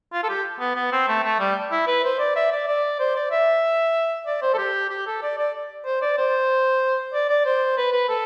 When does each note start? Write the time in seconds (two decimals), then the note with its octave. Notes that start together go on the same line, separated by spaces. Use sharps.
0.13 F4
0.23 A4
0.29 G4
0.60 B3
0.76 B3
0.92 C4
1.08 A3
1.24 A3
1.40 G3
1.72 E4
1.87 B4
2.04 C5
2.19 D5
2.36 E5
2.52 D5
2.68 D5
2.99 C5
3.16 D5
3.32 E5
4.27 D5
4.42 C5
4.54 A4
4.58 G4
4.90 G4
5.07 A4
5.23 D5
5.38 D5
5.85 C5
6.02 D5
6.18 C5
7.13 D5
7.29 D5
7.46 C5
7.77 B4
7.92 B4
8.09 A4